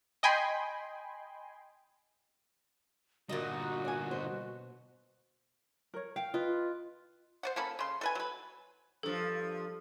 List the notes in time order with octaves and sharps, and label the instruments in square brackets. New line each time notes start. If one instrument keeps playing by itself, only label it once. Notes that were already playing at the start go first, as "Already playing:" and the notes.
[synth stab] D#5 G5 G#5 B5 C6
[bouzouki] A#2 D#4 [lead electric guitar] D3 G3 [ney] F#4
[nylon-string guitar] D5 G#5
B2 C5
[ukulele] A#4 C#5
[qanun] F5 [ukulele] G5
[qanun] F4 [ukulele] B4 D#5
[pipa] C5 D5 F#5
A#3 C#4 A4 B5
C#3 C6
A4 B4 G#5
F#3 B4
[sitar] G2 F3 [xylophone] A4